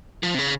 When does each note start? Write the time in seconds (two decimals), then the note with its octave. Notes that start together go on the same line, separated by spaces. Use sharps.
0.23 F3
0.35 C3
0.39 C#3